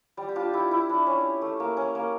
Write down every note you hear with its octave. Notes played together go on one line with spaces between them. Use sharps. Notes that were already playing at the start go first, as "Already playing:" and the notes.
G3
G4
D4 F4
E4 G4
E4
D4
C#4
A3
A#3
C#4
A#3